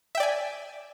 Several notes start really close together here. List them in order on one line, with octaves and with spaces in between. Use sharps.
E5 G5 D5 G#5